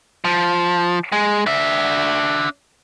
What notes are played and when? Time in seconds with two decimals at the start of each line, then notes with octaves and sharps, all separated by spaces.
0.25 F3
1.12 G#3
1.47 D4 E5